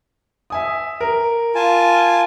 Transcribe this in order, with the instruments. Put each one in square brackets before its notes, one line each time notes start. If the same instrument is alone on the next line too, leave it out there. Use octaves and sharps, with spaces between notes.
[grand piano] E5 G#5 D#6
A#4
[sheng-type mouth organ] F4 G#5 A5